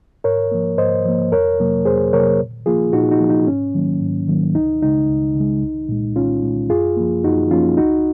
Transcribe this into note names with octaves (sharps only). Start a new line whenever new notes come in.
G#2 A#4 C#5
F3 A#3
G#2 C5 D#5
F3 A#3
F2 A#4 C#5
C3 F#3 A#3
F2 G#4 C5
C3 F#3 A#3 A#4 C#5
A#2
F3 A#3 F4 G#4
A#2 D#4 F#4
D#4 F#4
F3 A#3
D#4
G#2 C#4
D#3 F#3 A#3
G#2
D#3 F#3 A#3
C#2 D#4
C#3 G#3 D#4
C#2
C#3 G#3
C2
A#2 G#3
C2 C#4 F4
A#2 G#3
F#2 F4 G#4
F3 A#3
F#2 D#4 F#4
F3 A#3 C#4 F4
C#2 D#4 F#4